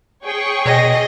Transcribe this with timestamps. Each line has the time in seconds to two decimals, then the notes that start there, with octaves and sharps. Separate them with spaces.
0.24 G#4 C#5 G5 C#6
0.65 B2 D#5